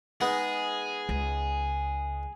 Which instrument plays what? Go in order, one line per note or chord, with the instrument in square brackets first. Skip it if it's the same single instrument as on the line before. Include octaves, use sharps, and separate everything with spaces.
[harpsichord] G#3 B3 D#4 [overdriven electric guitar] G#4
[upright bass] C#2